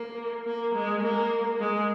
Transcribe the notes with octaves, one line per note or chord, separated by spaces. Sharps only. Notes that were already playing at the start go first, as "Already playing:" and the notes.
Already playing: A#3
A#3
G#3
A#3
G#3